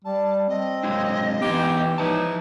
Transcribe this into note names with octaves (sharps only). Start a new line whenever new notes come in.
G3 A5
C4 D#5
F#3 G#3 D4
E3 B3 D#4 G4 G5
E3 F3 D#4 B4 A5